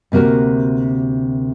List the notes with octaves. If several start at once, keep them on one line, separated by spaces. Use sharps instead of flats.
D2 C3 A#3 F#4 A#4